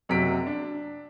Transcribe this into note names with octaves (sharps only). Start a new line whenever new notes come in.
F#1 F#2 C3 F#4 B6 D7
D4